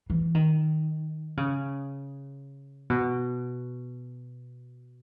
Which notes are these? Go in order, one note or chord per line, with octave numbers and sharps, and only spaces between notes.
E3
D#3
C#3
B2